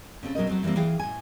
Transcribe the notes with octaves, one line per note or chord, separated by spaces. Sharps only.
C#3 C4 A4
B2 F#3 A#4 D#5
F#3 A3 C4
E3 F3 G3 A#3 C4
E3 G#4 F5 G5
A2 G#5